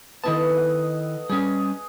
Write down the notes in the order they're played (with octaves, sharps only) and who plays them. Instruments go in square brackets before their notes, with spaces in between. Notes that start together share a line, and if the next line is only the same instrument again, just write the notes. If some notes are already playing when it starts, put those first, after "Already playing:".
[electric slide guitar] D#3 E4 A5 [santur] B3 A4 D#5
[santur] F#5
[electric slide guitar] G3 C#4 [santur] G#4